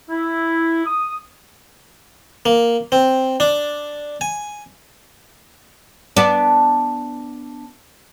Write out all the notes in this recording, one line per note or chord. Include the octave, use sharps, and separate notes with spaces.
E4
D#6
A#3
C4
D4
G#5
B3 D4